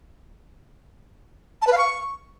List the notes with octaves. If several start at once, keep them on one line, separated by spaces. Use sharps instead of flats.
A5
B4
F5
C#6